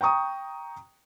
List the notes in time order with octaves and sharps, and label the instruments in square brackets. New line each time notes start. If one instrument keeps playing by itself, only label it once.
[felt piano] G5 A#5 C#6 D#6